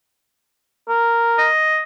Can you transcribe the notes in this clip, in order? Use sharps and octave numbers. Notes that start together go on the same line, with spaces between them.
A#4
D#5